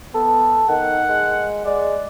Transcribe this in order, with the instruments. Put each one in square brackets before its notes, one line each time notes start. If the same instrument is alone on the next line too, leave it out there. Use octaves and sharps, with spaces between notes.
[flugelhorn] B3 [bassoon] A4
[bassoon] D#3 [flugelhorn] F#5
[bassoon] G#3
[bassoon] G#3 [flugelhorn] D5